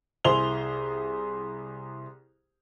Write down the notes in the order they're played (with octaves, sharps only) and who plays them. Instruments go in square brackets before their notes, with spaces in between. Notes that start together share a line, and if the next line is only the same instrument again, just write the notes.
[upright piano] C2 E4 G#4 C5 F7 G7